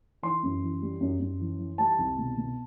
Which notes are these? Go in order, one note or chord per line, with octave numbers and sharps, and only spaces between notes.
E3 C6
F#2
E3
G3
F#2
F#2
E3
E3
G3 A5
C2
B2
B2